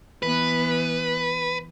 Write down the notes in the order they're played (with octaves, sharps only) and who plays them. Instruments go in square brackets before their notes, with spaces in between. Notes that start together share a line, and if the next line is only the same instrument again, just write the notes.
[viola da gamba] E3 B3 [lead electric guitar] B4